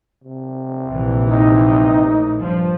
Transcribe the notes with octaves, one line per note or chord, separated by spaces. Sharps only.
C3
A#1 E3
C3 D#4
A2
G2 F3